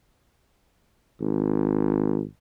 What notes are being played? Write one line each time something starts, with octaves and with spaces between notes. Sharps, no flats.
G#1